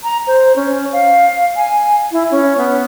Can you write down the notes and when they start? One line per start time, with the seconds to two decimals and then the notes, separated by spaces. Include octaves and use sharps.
0.03 A#5
0.27 C5
0.56 C#4
0.93 F5
1.57 G#5
2.12 E4
2.31 C#4
2.57 B3